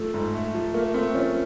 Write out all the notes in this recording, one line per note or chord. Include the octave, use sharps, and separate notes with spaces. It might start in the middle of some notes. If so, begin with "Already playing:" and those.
Already playing: F3 A3
G#2
A3
F3
A3 A#3
A3 C4
F3 C#4